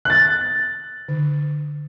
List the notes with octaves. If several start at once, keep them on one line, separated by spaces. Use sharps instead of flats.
F#6 A6
D3